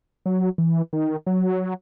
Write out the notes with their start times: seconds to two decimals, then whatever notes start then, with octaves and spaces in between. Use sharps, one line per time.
0.26 F#3
0.58 E3
0.93 D#3
1.26 F#3